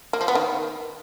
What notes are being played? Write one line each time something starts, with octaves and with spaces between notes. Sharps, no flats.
A#3
F3
B3
D#3